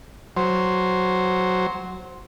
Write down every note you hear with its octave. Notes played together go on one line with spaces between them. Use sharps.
F#3 C5